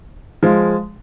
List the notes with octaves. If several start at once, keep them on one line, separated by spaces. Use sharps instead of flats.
F3 G#3